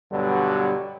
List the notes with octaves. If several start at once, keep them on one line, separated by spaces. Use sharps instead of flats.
G2 B2 D3 F#3 G3